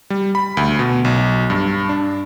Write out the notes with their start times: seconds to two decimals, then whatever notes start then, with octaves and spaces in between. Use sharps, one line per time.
0.10 G3
0.35 B5
0.57 D2
0.79 B2
1.05 B1
1.50 G2
1.89 D4